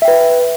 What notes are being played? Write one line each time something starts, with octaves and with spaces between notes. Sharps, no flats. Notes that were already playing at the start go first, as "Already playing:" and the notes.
B4 E5 G5